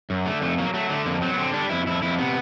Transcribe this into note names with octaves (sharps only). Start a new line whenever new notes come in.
F#2
D3 A3
F2 A3
F#3 A#3
F#3 A3
D3 A3
F2 A#3
F#3 C4
B3
D3 C4
G3 D4
F2 E4
F2 E4
F2 E4
C3 B3